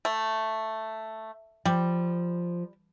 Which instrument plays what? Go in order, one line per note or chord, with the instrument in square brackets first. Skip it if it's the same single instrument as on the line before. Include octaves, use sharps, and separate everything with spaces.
[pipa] A3
[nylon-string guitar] F3 [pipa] G3